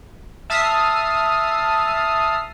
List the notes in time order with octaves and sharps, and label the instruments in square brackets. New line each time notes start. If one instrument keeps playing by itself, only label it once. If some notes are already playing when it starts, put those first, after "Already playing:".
[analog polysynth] E5 A5 D#6 F6 C7